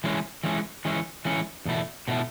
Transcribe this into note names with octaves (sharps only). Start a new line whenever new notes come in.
E3 G#3 C#4
E3 G#3 C#4
E3 G#3 C#4
E3 G#3 C#4
E2 B2 A3 E4
B2 A3 E4